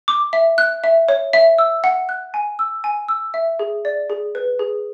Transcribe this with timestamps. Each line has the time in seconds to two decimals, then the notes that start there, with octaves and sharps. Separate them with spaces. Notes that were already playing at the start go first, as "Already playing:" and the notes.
0.08 D6
0.33 E5
0.58 F#6
0.84 E5
1.09 C#5
1.33 E5
1.59 E6
1.84 F#5
2.09 F#6
2.34 G#5
2.59 E6
2.84 G#5
3.08 E6
3.34 E5
3.59 G#4
3.85 D5
4.10 G#4
4.35 B4
4.59 G#4